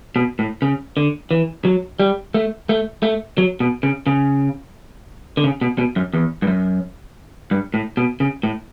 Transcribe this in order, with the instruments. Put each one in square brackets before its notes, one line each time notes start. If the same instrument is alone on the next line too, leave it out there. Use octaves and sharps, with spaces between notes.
[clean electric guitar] B2
A2
C#3
D3
E3
F#3
G3
A3
A3
A3
F#3
B2
C#3
C#3
D3
C#3
B2
B2
F#2
E2
G2
F#2
G2
A2
B2
C#3
A2